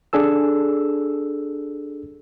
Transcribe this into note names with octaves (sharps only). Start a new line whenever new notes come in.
D4 G#4 A4 E6